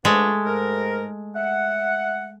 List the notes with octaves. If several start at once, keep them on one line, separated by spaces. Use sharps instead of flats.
F3 G#3 A3 B3 D4
G#2 A#4
E5 F#5